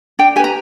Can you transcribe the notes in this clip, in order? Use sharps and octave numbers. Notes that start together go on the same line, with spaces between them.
D4 G5
G4 B4 G#5 A#5